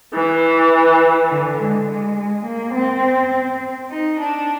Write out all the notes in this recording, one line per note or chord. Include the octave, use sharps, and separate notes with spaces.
E3
D3
G#3
G#3
G#3
A#3
C4
D#4
D4